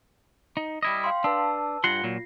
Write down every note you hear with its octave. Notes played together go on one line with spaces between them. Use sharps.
D#4
G3 E4 D#5
F5 G5 C6
D4 B4 A5 E6
G2 F4 F#5 C6 A#6 C7
A#2 F#3